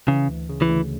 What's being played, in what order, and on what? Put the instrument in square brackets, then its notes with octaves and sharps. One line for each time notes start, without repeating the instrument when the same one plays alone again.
[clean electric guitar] C#3 [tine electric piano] E3
[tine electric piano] D2
C#3
[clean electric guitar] E3
[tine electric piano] D2